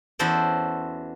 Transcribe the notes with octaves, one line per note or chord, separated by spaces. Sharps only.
E2 C#4 F#4 A4 C5 D5